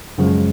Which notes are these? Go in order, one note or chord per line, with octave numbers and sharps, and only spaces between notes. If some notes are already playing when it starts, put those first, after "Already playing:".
F#2 C#3 F3 G#3